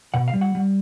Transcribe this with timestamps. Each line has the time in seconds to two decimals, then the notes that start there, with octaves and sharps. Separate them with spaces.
0.14 B2 F#5
0.28 F5
0.34 G3
0.41 F#5
0.55 G3